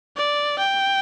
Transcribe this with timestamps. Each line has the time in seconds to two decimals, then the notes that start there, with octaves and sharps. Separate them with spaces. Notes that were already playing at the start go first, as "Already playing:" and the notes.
0.17 D5
0.59 G5